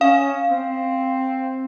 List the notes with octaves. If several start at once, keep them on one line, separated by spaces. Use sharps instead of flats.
C#4 F5
C4